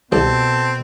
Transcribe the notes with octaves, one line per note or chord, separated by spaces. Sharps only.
C2 B2 C4 A4